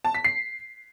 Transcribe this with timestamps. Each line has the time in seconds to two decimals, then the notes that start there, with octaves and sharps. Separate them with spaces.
0.05 A5
0.15 B6
0.25 C7